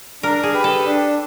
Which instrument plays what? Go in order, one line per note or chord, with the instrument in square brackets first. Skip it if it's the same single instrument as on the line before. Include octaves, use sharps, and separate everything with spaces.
[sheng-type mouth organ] D4 [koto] A#4
[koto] G#4
[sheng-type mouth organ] G4 B4
[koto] A4
[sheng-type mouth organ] D4